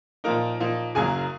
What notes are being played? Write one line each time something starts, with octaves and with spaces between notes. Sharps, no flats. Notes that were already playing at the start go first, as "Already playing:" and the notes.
A#2 F3 A#3 D#4 A#4 A#5
A#2 F3 A#3 D#4
F#1 F#2 C#3 F#3 A#3 G#4 G#5